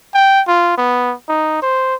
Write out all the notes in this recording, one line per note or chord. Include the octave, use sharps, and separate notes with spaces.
G5
F4
B3
D#4
C5